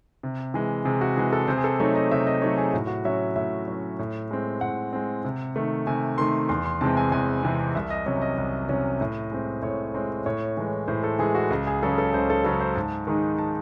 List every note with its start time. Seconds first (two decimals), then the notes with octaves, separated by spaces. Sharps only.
0.23 C3
0.54 E3 G#3
0.85 C3 G#4
1.01 F#4
1.16 E3 G#3 G#4
1.33 A4
1.48 C3 C5
1.57 G#4
1.64 A4
1.80 F#3 A3 D#4 C#5
1.95 D#5
2.11 C3 E5
2.27 D#5
2.42 F#3 A3 D#4 C#5
2.58 G#4
2.73 A2 F#4
2.87 F#4
3.05 F#3 C#4 E5
3.36 A2 E5
3.68 F#3 C#4
3.99 A2
4.31 G#3 C4
4.61 A2 F#5
4.93 G#3 C4
5.25 C3
5.56 D#3 A3
5.87 C3 G#5
6.18 D#3 A3 C6
6.49 E2 C6
6.66 C6
6.81 C3 E3 G#3 C4 A5
6.97 G#5
7.12 E2 G#5
7.43 C3 E3 G#3 C4
7.75 C2 E5
7.90 D#5
8.06 C3 F#3 C#4 D#5
8.22 D#5
8.38 C2
8.69 C3 F#3 C#4
9.01 A2
9.31 G#3 C4
9.62 A2 C#5
9.94 G#3 C4
10.26 A2 C#5
10.57 E3 G#3
10.88 A2 C5
11.04 A4
11.19 E3 G#3 G#4
11.35 F#4
11.50 C#2
11.67 G#4
11.82 C#3 F#3 C#4 A4
11.98 A4
12.14 C#2 C5
12.30 A4
12.44 C#3 F#3 C#4 A4
12.60 C5
12.76 G#2 A5
13.07 D#3 G#3 D#4
13.39 A5